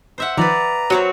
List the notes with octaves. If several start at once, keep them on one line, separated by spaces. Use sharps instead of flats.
C5 E5 F#5
D#3 F3 B4 D5 A#5
F#3 B3 C4 F#4 C#5